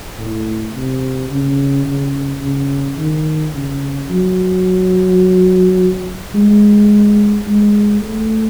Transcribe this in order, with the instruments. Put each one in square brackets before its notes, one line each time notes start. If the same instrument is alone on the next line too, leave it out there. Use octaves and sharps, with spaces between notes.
[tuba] A2
C3
C#3
C#3
C#3
D#3
C#3
F#3
G#3
G#3
A3